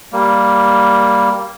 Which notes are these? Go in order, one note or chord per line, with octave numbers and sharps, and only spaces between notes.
G3 A#3